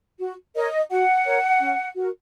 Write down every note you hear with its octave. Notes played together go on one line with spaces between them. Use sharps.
F#4
A#4 C#5 D#5
F#4 F#5
A#4 C#5
C#4
F#4 A#4